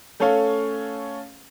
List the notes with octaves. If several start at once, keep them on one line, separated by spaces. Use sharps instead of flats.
A3 C#4 A4 C#5 F5